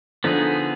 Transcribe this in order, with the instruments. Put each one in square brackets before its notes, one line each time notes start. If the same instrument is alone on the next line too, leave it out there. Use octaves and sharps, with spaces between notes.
[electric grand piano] D3 F3 [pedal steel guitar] B3 D#4 G#4